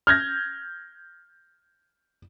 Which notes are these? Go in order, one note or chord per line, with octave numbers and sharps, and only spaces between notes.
F6 G6 G#6 A#6